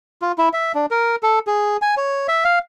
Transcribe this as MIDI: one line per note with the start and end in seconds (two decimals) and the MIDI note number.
0.22 0.32 65
0.38 0.49 64
0.53 0.72 76
0.75 0.86 62
0.91 1.16 70
1.23 1.39 69
1.47 1.77 68
1.82 1.95 80
1.97 2.27 73
2.28 2.44 76
2.44 2.59 77